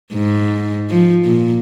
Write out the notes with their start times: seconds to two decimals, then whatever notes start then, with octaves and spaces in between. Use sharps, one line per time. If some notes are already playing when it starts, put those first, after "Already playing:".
0.14 G#2
0.90 F3
1.25 A#2